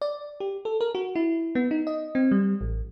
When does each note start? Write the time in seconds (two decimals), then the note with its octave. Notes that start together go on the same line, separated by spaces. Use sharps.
0.02 D5
0.40 G4
0.65 A4
0.81 A#4
0.95 F#4
1.16 E4
1.55 B3
1.71 D#4
1.87 D#5
2.15 C4
2.31 G3
2.61 A1